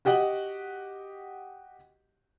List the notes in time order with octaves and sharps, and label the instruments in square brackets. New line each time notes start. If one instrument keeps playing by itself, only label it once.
[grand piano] F#4 G4 D#5 F#5